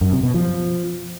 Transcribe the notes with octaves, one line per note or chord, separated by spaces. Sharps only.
F#2
C3
B2
F3